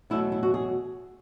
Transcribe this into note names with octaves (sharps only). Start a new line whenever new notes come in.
E2 B2 F#3 A3 E4
E4
F#4
G#4